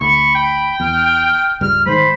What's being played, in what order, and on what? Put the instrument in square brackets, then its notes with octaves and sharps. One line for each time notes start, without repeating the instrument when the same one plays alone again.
[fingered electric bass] D2 [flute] B5 [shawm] C#6
[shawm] G5
[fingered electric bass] E2 [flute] F6
[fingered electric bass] C#2 G2 [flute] F6
[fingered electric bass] G#2 D#3 G#3 [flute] C5 [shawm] B5